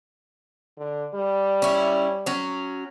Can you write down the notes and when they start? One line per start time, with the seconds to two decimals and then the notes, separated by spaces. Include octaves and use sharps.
0.78 D3
1.14 G3
1.62 C#4 E4
2.26 F#3 C#4